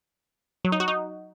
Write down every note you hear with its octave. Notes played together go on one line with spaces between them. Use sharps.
F#3
D#4
F#4
D#4